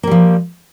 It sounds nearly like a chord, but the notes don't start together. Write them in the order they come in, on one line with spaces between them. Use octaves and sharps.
A#3 G3 F3